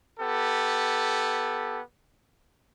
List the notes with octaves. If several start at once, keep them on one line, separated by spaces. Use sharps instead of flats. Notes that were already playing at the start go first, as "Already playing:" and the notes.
B3 G4 A4